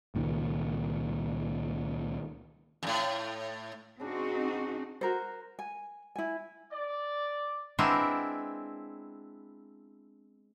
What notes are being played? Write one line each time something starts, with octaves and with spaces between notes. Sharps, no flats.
C#2 A#2 D#3
F2 A2
C#3 C4 D4 D#4 F#4
F#4 A#4 C5
G#5
E4 G#5
D5
G#3 B3 C4 D4 E4 A#4